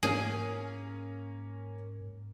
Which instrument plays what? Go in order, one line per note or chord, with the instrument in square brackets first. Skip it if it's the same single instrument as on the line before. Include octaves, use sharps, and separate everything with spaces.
[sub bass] G#2 [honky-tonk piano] A#3 C#4 [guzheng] G#4